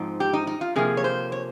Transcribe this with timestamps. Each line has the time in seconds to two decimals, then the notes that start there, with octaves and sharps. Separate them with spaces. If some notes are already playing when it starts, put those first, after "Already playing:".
Already playing: G#2 F3 C4 D#4
0.20 G4
0.33 D#4
0.47 D#4
0.61 F4
0.76 C3 F3 A#3 G#4
0.97 C#5
1.04 C5
1.32 C#5